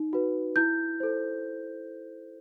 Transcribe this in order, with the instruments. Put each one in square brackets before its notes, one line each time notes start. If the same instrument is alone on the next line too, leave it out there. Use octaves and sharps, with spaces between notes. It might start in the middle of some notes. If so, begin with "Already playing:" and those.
Already playing: [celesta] D#4
F#4 B4
E4 G6
A4 C5